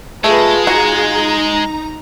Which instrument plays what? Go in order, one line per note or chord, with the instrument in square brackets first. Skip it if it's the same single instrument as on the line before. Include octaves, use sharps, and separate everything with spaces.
[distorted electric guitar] G#3 [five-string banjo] A3 [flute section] F4 G#4 [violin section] B4 A5 B5
[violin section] D#4 A#5 [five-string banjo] F#4